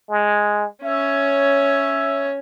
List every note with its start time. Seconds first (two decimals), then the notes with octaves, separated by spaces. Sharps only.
0.10 G#3
0.85 C#4 C#5 E5